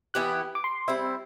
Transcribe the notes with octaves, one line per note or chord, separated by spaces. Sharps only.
E3 B3 E4 G4 F#6
D6
C6
G3 C4 E4 E5